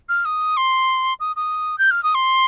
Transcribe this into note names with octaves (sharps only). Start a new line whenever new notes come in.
F6
D#6
C6
D#6
D#6
G6
F6
D#6
C6